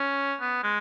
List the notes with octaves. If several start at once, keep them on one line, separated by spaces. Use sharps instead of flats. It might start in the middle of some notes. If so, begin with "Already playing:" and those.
Already playing: C#4
B3
G#3